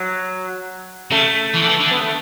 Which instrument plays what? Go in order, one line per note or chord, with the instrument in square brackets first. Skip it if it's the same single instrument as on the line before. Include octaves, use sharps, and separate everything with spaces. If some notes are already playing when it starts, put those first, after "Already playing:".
Already playing: [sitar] F#3
[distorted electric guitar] C#3 [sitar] A3
[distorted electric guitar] E3
D3
E3
D3
[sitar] B3
A3